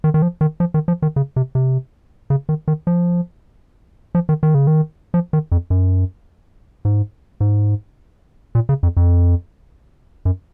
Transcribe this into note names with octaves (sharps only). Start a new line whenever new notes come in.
D#3
D#3
F3
D#3
F3
D#3
F3
D#3
C#3
C3
C3
C#3
D#3
D#3
F3
F3
D#3
D#3
C#3
D#3
F3
D#3
F2
F#2
G#2
G#2
A#2
C#3
F2
F2
F#2